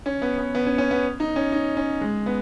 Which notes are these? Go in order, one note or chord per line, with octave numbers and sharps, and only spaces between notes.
C#4
B3
B3
B3
C#4
C#4
B3
D#4
C#4
D#4
C#4
G#3
B3